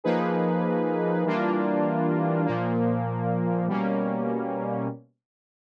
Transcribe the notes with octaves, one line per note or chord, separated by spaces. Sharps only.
F3 A#3 D#4 G#4 B4
E3 G3 A#3 D4 F4
A#2 F3 A#3
B2 G3 A#3 C#4